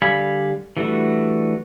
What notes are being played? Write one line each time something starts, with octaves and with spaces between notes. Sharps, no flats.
D3 G3 F5 G#5 B5
E3 G3 A3 D4 F#4